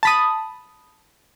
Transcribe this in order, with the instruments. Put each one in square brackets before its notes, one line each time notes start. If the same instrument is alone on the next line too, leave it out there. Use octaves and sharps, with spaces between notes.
[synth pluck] A5 B5 D#6